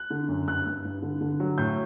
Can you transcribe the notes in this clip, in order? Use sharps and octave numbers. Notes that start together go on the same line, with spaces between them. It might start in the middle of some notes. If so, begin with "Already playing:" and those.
Already playing: F#6
D3
F#2
G2 F#6
G2
G2
D3
D3
F#3
A2 G6